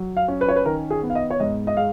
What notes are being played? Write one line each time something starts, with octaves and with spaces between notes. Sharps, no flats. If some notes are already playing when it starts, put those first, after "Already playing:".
Already playing: F#3
F5
C#4
B4
C#5
B4
D#3 A#4
G#4
B3
F5
D#5
C#5
G#2 D#5
D#5
G#3 F5